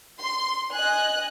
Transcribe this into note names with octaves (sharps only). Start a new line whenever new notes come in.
C6
D#5 G#5 F#6